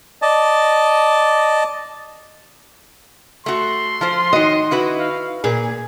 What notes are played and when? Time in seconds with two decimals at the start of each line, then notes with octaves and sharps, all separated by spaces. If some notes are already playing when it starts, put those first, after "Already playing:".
0.22 D5 D#5 A5
3.46 A3 F#4 C6
4.01 F3 F4 C5
4.33 D#3 F#4 D#5
4.71 E4 F#4 B4
4.99 F5
5.44 A#2 G#4 G#5